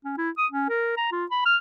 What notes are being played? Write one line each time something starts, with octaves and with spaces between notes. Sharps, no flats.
C#4
E4
D#6
C#4
A#4
A#5
F4
B5
F6